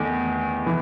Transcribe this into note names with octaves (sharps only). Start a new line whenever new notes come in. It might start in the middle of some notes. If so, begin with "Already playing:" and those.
Already playing: E2 D#3 A3
E3